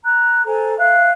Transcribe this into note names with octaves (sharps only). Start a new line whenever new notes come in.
A#5 F#6
A4 C5 G#5 A#5
E5 F5 F#6